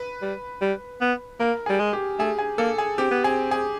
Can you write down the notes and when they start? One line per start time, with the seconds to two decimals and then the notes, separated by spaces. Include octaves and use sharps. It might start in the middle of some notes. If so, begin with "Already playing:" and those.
Already playing: B4
0.22 G3
0.61 G3
1.01 B3
1.40 A#3 A#4
1.66 G3 G#4
1.80 G#3
1.93 G4
2.19 A3 G#4
2.39 G#4
2.58 A#3 A4
2.78 G#4
2.98 C4 G4
3.11 B3
3.24 C4 G#4
3.51 G#4